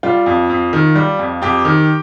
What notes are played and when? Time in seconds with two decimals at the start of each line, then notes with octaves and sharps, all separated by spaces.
0.03 G3 F4
0.26 F2
0.50 F2
0.73 D#3
0.96 G3
1.19 F2
1.42 F2 G4
1.65 D#3